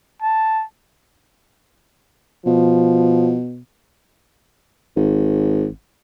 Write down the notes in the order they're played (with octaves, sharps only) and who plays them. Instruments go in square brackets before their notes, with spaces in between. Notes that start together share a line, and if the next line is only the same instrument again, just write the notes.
[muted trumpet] A5
[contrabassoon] B2 [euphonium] F3
[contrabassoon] G#1